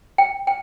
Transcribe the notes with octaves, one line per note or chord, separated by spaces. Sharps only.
G5
G5